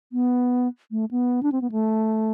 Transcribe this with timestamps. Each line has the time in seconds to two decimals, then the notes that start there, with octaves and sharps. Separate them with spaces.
0.12 B3
0.91 A3
1.11 B3
1.43 D4
1.52 C4
1.61 B3
1.72 A3